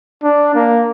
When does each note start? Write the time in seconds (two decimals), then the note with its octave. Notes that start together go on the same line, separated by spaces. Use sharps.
0.23 D4
0.55 A#3